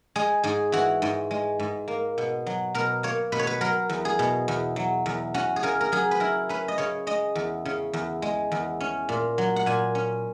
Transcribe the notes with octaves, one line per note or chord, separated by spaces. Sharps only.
G#3 G#4
G#2 G#4
E3 F#4
G#2
G#3
G#2
A#3
B2
F#3
B2 A#4
A#3 C#5
B2 B4
C#5
B4
F#3 A#4
E2
G#4
B2
E2
F#3
E2
C#4 F#4
G#4
C#3 A#4
A#4
F#3 G#4
B4
E4 A#4
C#4 B4
D#5
C#3 C#5
G#3 D#5
E2
C#3
E2
G#3
E2
C#4
A#2
F#3
F#5
A#2 G#5
C#4